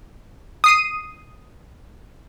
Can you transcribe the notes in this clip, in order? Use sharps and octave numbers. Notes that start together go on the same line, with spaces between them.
D#6 C7 D#7